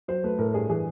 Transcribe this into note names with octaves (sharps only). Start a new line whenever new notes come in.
F#3 C5
A3 B4
A2 A#4
G2 G#4
E3 G#4